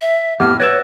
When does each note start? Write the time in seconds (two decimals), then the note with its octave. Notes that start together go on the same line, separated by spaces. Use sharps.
0.02 E5
0.40 F2 A2 B3 G4 F6
0.60 F#4 B4 C#5 D5 E5